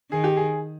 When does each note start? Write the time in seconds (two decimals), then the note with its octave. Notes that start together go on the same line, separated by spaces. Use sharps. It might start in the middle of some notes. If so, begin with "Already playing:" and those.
0.11 D#3 G#4
0.24 G4
0.37 G#4